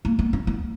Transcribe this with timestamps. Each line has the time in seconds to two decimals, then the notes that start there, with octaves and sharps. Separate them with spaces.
0.05 A#3
0.19 B3
0.33 C#4
0.47 B3